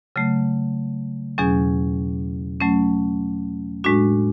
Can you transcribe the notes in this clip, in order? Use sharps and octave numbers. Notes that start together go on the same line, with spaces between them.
C#3 F#3 A3
E2 B2 F#3 C#4 G#4
F#3 A3 C#4
A2 G#3 D4 F#4